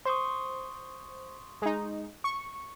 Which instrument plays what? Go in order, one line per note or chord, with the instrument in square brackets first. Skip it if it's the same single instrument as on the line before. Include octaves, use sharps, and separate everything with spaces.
[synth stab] C5 [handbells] C6 C#6 D#6
[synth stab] G#3 D#4
C#6